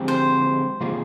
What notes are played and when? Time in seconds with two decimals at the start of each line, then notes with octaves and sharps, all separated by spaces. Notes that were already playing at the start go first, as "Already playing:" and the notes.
Already playing: D3 F3 G#3 C4 G4
0.08 C5
0.81 C3 D#3 A#3 F4 G#4